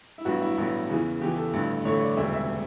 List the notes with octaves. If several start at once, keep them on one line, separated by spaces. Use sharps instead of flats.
E4
A1 G2 F#3 B3 F#4
E4
A1 G2 F#3 B3
E2 C#3 E3
E2 C#3 E3 G4
A4
A1 G2 D3 A3
A1 G2 D3 A3 C#5
D5
E1 D2 C#3 G3 E5
E5